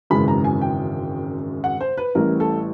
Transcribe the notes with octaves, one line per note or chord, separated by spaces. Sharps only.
G#1 F#2 C#3 E3 G#3 B5
A#5
G#5
G5
F#5
C5
B4
A1 A2 E3 G3 A#4
A4